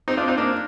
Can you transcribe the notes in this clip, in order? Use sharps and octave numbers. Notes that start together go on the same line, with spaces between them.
C4 D#4
D4 F4
C4 D#4
A#3 D4